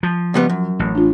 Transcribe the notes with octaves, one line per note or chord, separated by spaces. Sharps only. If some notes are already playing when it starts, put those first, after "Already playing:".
F3
C#2 G3 B3
F#2
A1
D4 F4